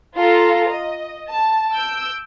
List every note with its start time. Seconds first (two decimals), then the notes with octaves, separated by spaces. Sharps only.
0.16 F4 A4 A#5
0.71 D#5
1.29 A5
1.72 E6 G6 D7